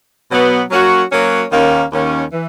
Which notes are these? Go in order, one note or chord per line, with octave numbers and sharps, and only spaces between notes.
B2 F#3 B3
F#3 A#3 C#4 F#4 C#5
F#3 A#3 C#4 F#4 C#5
D#2 D#3 A#3 C#4
D#2 D#3 A#3 C#4
E3